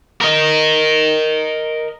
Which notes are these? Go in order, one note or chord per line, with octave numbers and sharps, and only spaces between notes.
A#4 D#5